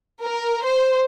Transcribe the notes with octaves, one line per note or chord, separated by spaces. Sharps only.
A#4
C5